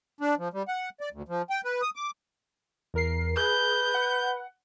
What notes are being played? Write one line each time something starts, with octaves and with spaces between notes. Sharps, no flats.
D4
F3
G3
F#5
D5
D2
F3
G5
B4
D#6
D6
E2 A#4 C7
G#4 B4 G6
F#5